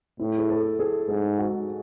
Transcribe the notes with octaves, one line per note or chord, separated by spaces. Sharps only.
A2 E4
G#4
A4
G#4
G#2 G#4
F#4